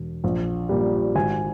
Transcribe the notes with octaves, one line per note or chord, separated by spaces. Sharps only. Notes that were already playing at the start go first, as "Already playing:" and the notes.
Already playing: E1
A#1
A#2 G3
G#1 G#5